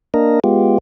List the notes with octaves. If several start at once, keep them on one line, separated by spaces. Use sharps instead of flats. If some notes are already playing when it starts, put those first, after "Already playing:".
A#3 D4 A#4 D#5
G#3 B3 F4 G4